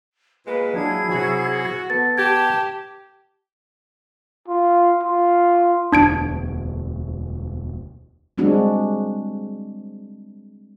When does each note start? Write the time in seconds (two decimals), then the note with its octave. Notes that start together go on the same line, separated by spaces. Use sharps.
0.46 A#2 G#3 A#3 B4
0.74 F#3 D4 E4 G#4 G#6
1.09 C3 F#3 F#4
1.90 B3 A4 A6
2.18 G4 A5 G#6
4.48 F4
5.03 F4
5.92 E1 D2 D4 G#6 D7
8.38 G3 G#3 C4 D4 F#4